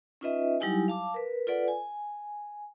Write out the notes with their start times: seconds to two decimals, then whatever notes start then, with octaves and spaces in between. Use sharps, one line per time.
0.21 C#4 D#4 F4 B4 D#5 E5
0.60 F#3 G3 D#4 E4 G4 G#5
0.88 F5 A5 D6
1.14 A#4 B4
1.47 F4 A4 B4 D5 F#5
1.68 G#5